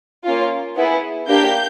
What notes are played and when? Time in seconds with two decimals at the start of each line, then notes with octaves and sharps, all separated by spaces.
0.24 A#3 C#4 F4
0.76 B3 E4 G#4
1.28 A#3 D4 G4 G6